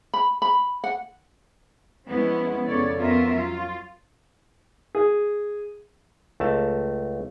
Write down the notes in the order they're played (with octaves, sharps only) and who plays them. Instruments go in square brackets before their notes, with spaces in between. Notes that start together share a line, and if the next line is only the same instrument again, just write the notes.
[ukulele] B5
B5
F#5
[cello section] F3 G#3 B3 C#4 E4
F2 C#3 B3 A4 C#5 D5
F2 B3 C#4 F4 A#4 E5
F#3 F4
[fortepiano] G#4
[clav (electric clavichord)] C#2 A3 A#4 A5